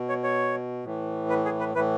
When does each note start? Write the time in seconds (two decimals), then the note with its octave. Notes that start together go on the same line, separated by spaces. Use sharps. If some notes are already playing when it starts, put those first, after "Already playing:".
Already playing: B2
0.09 C#5
0.24 C#5
0.84 A2 E3
1.29 B4
1.45 G#4
1.60 B4
1.75 A2 E3 B4